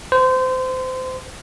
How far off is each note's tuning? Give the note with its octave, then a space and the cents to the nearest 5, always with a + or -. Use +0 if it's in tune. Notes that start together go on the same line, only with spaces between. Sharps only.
C5 -25